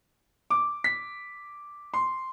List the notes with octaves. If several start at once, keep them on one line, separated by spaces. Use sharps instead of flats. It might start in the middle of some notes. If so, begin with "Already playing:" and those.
D6
B6
C6